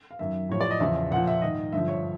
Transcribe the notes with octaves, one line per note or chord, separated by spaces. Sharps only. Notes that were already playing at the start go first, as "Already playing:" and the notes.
F5
F#2 D#3 E5
A2 F3 C#5
D5
D#5
E2 C#3 F3 E5
A#2 F3 F#5
E5
G#2 D#3 D#5
G2 D3 F3 E5
C#5